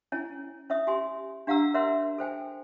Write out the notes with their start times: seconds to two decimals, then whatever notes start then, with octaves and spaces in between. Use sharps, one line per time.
0.12 C#4 E4 C#5 G#5
0.70 C#4 C#5 E5 D#6
0.87 G4 G#5 C6
1.47 D4 G4 F5 F#5 A#5 E6
1.74 A#4 C#5 E5 F#5 C6
2.18 A4 C5 G5 G#5